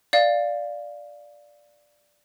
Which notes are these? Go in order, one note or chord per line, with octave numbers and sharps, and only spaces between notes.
D5 F5